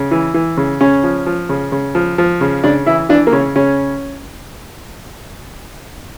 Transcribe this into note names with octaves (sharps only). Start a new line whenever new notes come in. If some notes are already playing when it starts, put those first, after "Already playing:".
Already playing: C#3
E3
E3
C#3
C#3 C#4
F3
F3
C#3
C#3
F3
F3
C#3
C#3 D4
E3 E4
E3 D4
A#3
C#3 C#4
C#3 C#4